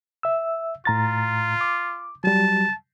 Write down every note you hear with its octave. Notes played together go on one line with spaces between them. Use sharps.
E5 E6
A2 F4 A#5 A6
D6
F#3 G3 A5